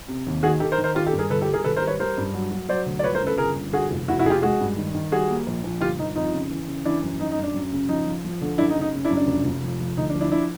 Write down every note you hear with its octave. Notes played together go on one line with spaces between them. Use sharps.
C3
D#2
D#3 F#4 G#4
D#3 G4 A4
A#4 C5
D#3
A#4 C5
D#3 F4 G4
G4 A4
G2
G#4 A#4
G1 A4 B4
G4 A4
G3
G#4 A#4
G#1 A4 B4
A#4 C5
G3
B4 C#5
G3 A#4 C5
G2
F#3
F#3
F#3 C5 D5
D2
D5
G1 B4 C#5
A#4 C5
C#3
A4 B4
G1 G#4 A#4
G1
D3 F#4 G#4
F1
F1 E4 F#4
E4 F#4
F1 F4 G4 G#4
G#3 F#4 G#4
G2
D#3
D#3
G3 F#4 G#4
A#3
A#1
A#1
G1 F4 G4
G1 D#4
F2 D#4 F4
C#3
E3
C#3
E3 D4 E4
F#2
F#2 D#4
D#4
F#2
D4
F#2
C#3
F3 D#4
F3
F3
D3
F#2 D4 E4
D#4
C#3
D#4
C#3
D4 E4
F#2
D4
F1
F1
F3
F3
D2 D#4
D4
F3
D4 E4
D4 E4